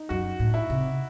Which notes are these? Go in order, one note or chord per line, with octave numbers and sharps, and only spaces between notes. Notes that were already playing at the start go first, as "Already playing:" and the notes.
Already playing: D#4
F#2 F#4
A2
E4
C3